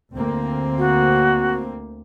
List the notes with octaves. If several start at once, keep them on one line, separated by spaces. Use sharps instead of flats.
D2 A#3 C4
F#4